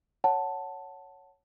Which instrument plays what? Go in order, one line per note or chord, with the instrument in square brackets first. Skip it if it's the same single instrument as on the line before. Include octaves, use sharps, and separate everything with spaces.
[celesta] C#5 F#5 A5